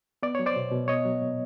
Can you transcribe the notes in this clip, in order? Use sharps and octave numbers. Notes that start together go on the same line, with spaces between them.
B3 D5
F#3 C#5
C5 D5
B2
B2
B3 C#5 D#5
F#3
A#2